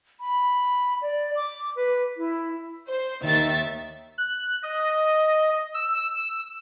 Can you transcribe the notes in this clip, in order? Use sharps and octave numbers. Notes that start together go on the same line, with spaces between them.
B5
D5
D6
B4
E4
C5
D#2 D#3 E5 A6
F#6
D#5
E6